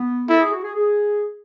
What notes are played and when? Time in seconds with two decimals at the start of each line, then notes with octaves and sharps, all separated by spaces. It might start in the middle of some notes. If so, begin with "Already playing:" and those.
Already playing: B3
0.28 E4 A4
0.40 G#4
0.52 F#4
0.64 G#4
0.75 G#4